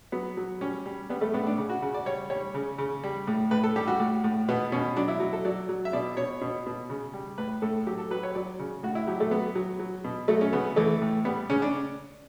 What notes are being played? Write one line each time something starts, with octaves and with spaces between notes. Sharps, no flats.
F#3 B3
F#3
G3 C#4
G3
G3 B3
A3
A2 B3
D4
C#3
F#4
C#3
D5
G3 C#5
G3 C#5
C#3
C#3
G3
A2
A2 B4
A4
G3 G4
F#4
A2
A2
B2 B3
B2 C#4
F#3 D4
E4
F#3
A4
F#3 D5
F#3
E5
B2 D5
B2 C#5
B2
B2
C#3
G3
A2 B4
A2 A4
F#3 G4
A4
F#3 B4
C#5
F#3 D5
C#3
A2 F#4
E4
F#3 G4
A3
F#3 B3
F#3
F#3
B2
F#3 A3
C#4
C#3 B3
E3 A3
A2
G3 B3
C#3 C#4
D4